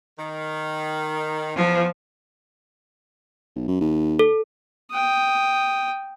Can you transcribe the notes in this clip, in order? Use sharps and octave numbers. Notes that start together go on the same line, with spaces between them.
D#3
E2 F3 F4
B1
F#2
D#2
A4
G5 D#6